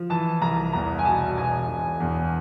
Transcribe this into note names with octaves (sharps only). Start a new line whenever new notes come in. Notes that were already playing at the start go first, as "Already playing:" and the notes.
Already playing: F3
E3 A5
C2 A#5
E2 A#5
G#5
B2 A5
E1 G#5
E1
E2